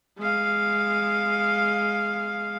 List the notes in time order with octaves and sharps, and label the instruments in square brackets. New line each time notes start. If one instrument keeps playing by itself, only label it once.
[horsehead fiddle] G#3 F5